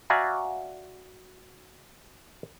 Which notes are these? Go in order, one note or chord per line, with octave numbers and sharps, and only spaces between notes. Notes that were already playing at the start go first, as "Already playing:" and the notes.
F#4 D5 E5 F5 G#5 A#5